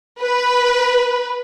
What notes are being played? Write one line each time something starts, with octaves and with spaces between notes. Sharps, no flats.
B4